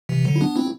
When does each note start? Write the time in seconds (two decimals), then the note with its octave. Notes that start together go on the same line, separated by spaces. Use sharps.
0.09 C3 E3
0.24 D3 F#3
0.36 E4
0.41 B3 D4
0.56 C4 E4